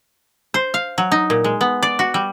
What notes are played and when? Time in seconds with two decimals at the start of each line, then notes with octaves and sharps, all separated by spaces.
0.54 C5
0.74 F5
0.98 F#3
1.12 D#4
1.30 A#2
1.44 G#3
1.61 B3
1.83 D5
1.99 F#4
2.14 G3